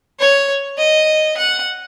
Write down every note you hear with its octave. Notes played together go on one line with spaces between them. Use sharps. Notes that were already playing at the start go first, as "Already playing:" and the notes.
C#5
D#5
F#5